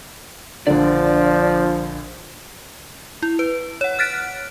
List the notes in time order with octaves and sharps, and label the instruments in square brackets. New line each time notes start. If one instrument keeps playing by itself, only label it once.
[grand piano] A#1 D3 [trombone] F3 [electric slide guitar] D5
[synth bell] E4
B4
C#5 F#5
F6 F#6 A6 B6 D7